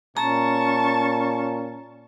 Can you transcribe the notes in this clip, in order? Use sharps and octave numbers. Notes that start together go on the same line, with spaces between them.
A#2 C#4 A5 A#5 C#6